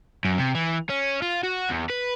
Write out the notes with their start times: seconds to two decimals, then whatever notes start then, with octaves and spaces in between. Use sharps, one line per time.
0.25 F#2
0.38 C3
0.55 E3
0.90 C#4
1.22 F4
1.43 F#4
1.69 E2
1.90 B4